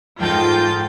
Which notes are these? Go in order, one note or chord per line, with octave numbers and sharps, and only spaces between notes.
G#2 F4 A4 G5 G6 A6